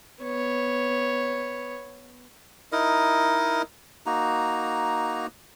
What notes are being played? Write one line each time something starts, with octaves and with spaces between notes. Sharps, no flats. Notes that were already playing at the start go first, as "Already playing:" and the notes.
B3 C#5
D#4 E4 A#4 D#5
A#3 D#4 F#4 A#5